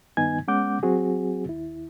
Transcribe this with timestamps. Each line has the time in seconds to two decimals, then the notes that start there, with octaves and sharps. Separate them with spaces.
0.17 G2 D#3 B3 D#4 G#5 G#6
0.48 G#3 B3 C#4 F#5 D6 G6
0.83 F#3 C4 F#4 G#4
1.46 D#2 E4